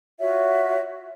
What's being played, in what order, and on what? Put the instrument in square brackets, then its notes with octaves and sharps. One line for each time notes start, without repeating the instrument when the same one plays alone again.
[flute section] F4 F#4 C#5 E5